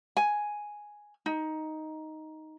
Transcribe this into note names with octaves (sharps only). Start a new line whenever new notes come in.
G#5
D#4